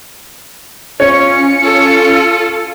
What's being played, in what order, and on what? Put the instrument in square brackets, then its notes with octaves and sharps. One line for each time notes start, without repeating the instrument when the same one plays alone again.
[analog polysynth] C#4 [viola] F4 [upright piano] C#5 [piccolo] C#7
[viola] F4 A4